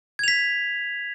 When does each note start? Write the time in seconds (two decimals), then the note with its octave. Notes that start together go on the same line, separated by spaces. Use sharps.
0.19 G#6
0.24 F7
0.28 B6